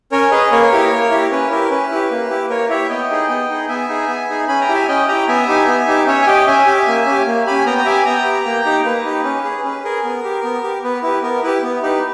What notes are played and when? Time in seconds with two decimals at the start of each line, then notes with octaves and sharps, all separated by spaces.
0.12 C#4 A#4 C#5
0.31 G#4 B4 D#5
0.52 A#3 A#4 C#5
0.72 E4 G4
0.91 A#3
1.11 E4 G4
1.31 C#4 B4
1.50 E4 G4 A#4
1.70 C#4 B4
1.91 E4 G4
2.11 A#3
2.30 E4 G4
2.50 A#3 A#4 C#5
2.69 E4 G4 C#5 E5
2.89 B3 D#5 G5
3.10 D#4 G#4
3.29 B3
3.49 D#4 G#4
3.69 B3 E5 G#5
3.88 D#4 G#4
4.08 B3
4.29 D#4 G#4
4.48 C#4 G#5 B5
4.61 G5 A#5
4.69 E4 G4
4.75 E5 G#5
4.88 C#4 D#5 G5
5.08 E4 G4 G5 A#5
5.28 B3 E5 G#5
5.48 D#4 G4
5.67 B3
5.88 D#4 G4
6.07 C#4 C#5 E5
6.22 G#5
6.27 G4 D#5 G5
6.46 C#4 E5 G#5
6.67 G4
6.87 A#3
7.06 C#4 G4
7.27 A#3
7.46 C#4 G4 G#5 B5
7.65 B3 G5 A#5
7.78 A#5
7.85 G4 E5 G#5
8.05 B3 G5 A#5
8.25 G4
8.45 A#3
8.65 D#4 G4
8.85 A#3 B4
9.05 D#4 G4
9.24 C#4
9.45 G#4
9.64 C#4 B4
9.85 G#4 A#4
10.04 B3
10.24 G4
10.43 B3
10.63 G4
10.84 B3 B4
11.03 E4 G4 B4
11.23 B3 A#4
11.43 E4 G4 B4
11.63 B3
11.82 D#4 G4 B4